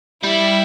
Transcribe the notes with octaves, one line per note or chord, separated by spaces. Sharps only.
G3 E4